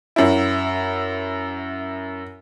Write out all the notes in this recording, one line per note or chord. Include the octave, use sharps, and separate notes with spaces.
F#2 E4